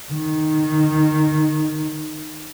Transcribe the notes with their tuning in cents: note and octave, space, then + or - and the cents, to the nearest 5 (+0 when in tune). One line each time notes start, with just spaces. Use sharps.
D#3 -5